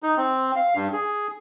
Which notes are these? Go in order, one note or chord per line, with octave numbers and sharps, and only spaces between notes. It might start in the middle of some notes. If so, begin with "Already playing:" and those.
D#4
C4
F5
G2
G#4